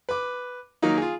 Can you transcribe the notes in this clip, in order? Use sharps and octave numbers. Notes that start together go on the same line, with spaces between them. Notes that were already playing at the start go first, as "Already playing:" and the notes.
B4 D6
D#3 F#3 A#3 D#4
F4 G#4